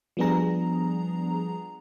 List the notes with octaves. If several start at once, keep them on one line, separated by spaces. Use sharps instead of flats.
F3 G3 B3 D4 G#4 A#5